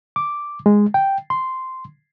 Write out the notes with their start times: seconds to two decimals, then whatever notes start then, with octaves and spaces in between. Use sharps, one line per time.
0.16 D6
0.66 G#3
0.94 G5
1.30 C6